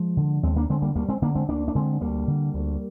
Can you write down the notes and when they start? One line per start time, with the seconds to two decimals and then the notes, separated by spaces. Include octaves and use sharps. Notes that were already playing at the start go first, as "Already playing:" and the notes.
Already playing: F3 G#3
0.17 D3
0.43 D#2 G#3 C4
0.56 A#3 D4
0.69 D3 G#3 C4
0.82 G3 A#3
0.95 D2 G3 A#3
1.09 G#3 C4
1.22 D3 A#3 D4
1.35 G#3 C4
1.49 D2 A#3 D4
1.68 D4
1.75 D3 G#3 C4
2.01 D2 G3 A#3
2.28 D3
2.54 D2